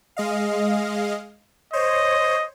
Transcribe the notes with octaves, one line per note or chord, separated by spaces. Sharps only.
G#3 D#5 F5
C5 C#5 D#5